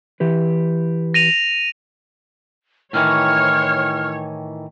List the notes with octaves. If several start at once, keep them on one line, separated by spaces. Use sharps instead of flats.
E3 G4 B4
A#6 D#7 F7
A2 D#3 E3 C#5 F6